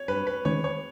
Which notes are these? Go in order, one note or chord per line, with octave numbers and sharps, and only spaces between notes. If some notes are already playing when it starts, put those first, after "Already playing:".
Already playing: C#5
G2 B4
B4
D#3 G#3 C#4 C#5
C#5